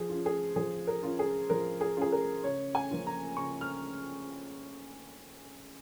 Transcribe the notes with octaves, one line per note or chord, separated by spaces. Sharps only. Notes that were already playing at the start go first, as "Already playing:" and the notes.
Already playing: F3 G#4
C#4 F4
G#4
F3 G#4
A#4
C#4 F4
G#4
F3 A#4
G#4
C#4 F4 G#4
A#4
C#3 C#5
G#5
F3 A#3 C#4 F4
A#5
C#3 C#6
F6